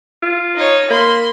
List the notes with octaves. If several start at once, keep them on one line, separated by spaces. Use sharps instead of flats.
F4
D#4 C#5
A#3 B5 C6